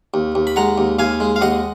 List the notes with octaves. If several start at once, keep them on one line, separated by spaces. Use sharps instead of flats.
D#2
D#2
B5
G#3 F#5 A#5
D#2
D#2 F5 G#5
G#3
F5
D#2 D#5 F#5